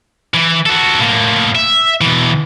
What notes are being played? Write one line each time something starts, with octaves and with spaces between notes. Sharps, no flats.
E3
F#4 A4
A2 A#3
E5
B2 E3